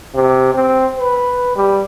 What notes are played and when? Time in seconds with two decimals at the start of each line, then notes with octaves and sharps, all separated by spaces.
0.14 C3
0.54 C4
0.99 B4
1.56 G3